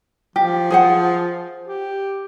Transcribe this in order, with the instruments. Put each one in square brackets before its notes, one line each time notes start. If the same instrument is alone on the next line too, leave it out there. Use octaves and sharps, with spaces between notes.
[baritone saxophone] F3 [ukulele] G4
[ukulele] G#4 C5 F#5
[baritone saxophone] G4